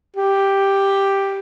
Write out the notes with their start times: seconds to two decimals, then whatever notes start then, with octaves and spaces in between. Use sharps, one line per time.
0.16 G4